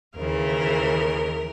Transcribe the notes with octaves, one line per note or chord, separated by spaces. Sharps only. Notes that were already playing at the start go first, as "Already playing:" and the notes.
D#2 C#3 E3 A#4